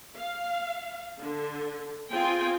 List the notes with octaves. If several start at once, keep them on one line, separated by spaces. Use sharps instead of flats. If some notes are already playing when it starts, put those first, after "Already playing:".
F5
D3
C4 F4 G#4 G5 G#5